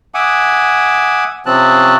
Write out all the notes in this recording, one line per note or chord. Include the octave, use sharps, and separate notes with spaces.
E5 F#5 G#5 D6 D#6
C3 F3 C4 C#4 A5 F#6